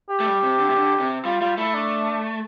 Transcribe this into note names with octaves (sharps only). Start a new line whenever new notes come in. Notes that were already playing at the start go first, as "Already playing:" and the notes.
G4
A3
G3
C3
D3
C3
D3
C3
G3 F4
G3 F4
A3 E4
D4